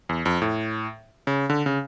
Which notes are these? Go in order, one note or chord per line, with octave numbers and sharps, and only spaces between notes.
E2
F2
A2
C#3
D3
C#3